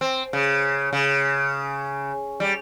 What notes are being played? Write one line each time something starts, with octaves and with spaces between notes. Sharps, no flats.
C4
C#3
C#3
G3